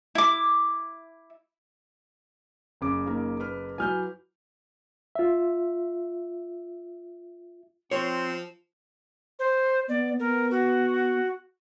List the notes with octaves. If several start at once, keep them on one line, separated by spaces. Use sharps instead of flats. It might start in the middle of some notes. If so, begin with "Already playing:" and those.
E4 D6
F#1 C#3 D6
A#3 D#4 A#4
B4 F6
F#3 E4 B4 G#5 F6 G6
F4 E5
F3 C4 C#5 C6
C5
B3 D5
B3 A#4
F#4